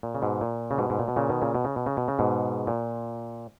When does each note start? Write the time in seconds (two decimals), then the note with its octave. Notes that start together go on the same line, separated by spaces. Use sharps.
0.03 A#2
0.15 C#3
0.22 G#2 B2
0.41 A#2
0.71 C#3
0.78 G#2 B2
0.90 G#2
0.99 A#2
1.08 B2
1.16 A#2 C#3
1.30 B2 D#3
1.42 A#2 C#3
1.55 B2
1.65 C#3
1.76 B2
1.86 C#3
1.97 B2
2.08 C#3
2.19 G#2 B2
2.67 A#2